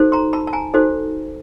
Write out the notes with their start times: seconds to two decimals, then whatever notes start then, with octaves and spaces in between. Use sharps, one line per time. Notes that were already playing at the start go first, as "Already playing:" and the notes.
Already playing: D#4 F#4 A4 C5
0.12 A#5 C6
0.33 A5 B5
0.47 A5
0.53 G#5 A#5
0.74 D#4 F#4 A4 C5